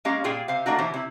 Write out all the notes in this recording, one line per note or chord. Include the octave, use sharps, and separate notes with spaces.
G#3 A#3 C#4 G4 D#5 F5
A#2 F4 G#4 F5 G5
C3 C5 F5
F3 A3 A#3 D4 D#4 F#4
B2 E3 G4 C5 C#5
C3 E4